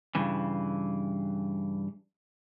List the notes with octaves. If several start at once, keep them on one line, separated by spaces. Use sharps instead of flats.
G2 C#3 E3